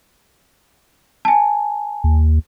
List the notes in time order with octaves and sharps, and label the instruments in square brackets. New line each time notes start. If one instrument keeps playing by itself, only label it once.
[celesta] G#5 A5
[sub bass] D#2